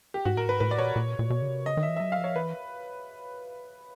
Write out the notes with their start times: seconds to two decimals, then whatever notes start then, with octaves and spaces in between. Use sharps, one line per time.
0.14 G4
0.25 G#2 F#4
0.36 A2 A#4
0.47 G#2 B4
0.60 A2 B4
0.71 D5
0.78 A#2 C#5
0.96 A#2
1.19 A#2
1.30 B2
1.42 C#3
1.48 C3
1.66 C#3 D#5
1.77 D#3
1.83 E5
1.89 E3
1.96 E5
2.00 F#3 D#5
2.12 F5
2.18 F3
2.24 C#5
2.35 E3 B4